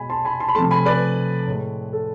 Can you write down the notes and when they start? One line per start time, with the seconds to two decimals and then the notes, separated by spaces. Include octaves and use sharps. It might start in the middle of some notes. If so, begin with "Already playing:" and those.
Already playing: B2 G#3 G#5 B5
0.10 A5 C6
0.25 G#5 B5
0.40 A5 C6
0.48 B5
0.55 C3 F3 A3 A5 C6
0.71 G#5 B5
0.85 B4 D5
1.47 A2 G#3
1.93 A4